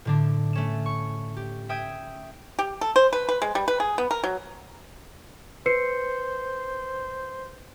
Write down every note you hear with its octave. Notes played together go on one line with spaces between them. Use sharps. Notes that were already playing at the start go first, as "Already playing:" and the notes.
A2 D3 D4
A3 C#4 E7
C#6
G4
E5 G5 D#6 G#6
G4
A4
C5
B4
B4
G#3
G3
B4
G#4
B3
A#4
F#3
B4 C5 C7 C#7